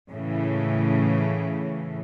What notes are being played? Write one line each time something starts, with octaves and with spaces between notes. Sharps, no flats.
A2 C#3 E3